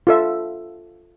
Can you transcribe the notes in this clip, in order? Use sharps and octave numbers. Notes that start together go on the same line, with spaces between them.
F4 A4 E5